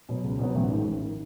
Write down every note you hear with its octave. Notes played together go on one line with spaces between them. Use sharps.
B2 F#3 B3
C#2
B2 F#3 B3
A1
G#2 D#3
A1
D#3